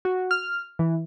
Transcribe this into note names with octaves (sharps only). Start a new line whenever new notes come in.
F#4
F6
E3